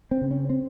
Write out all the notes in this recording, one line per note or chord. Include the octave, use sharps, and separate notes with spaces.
C4
C#3
C#4
C4